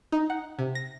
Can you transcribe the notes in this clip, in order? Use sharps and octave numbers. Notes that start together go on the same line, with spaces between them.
D#4
F#5
C3
A#6